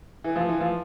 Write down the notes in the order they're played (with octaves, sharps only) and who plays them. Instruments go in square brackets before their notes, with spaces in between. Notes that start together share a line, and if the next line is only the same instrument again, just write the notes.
[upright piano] E3
F3
E3
F3